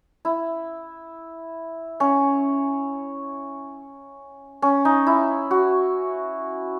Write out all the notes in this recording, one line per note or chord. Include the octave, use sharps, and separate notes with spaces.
E4
C#4
C#4
D#4
E4
F#4